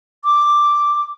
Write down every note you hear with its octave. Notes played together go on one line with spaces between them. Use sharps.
D6